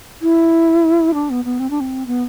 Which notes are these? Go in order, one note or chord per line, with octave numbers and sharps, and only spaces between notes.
E4
D4
B3
B3
C4
D4
C4
B3